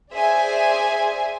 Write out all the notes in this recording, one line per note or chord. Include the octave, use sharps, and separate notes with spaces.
G#4 C5 D5 E5 G#5